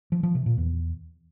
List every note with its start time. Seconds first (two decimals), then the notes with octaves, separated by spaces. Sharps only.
0.12 F3
0.23 F3
0.35 C3
0.46 A#2
0.57 E2